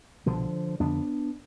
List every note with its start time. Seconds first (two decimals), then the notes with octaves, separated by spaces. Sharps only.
0.26 C2 B2 D3 F3
0.80 F2 D3 B3 D4